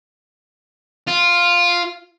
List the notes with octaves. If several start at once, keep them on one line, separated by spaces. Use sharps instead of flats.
F4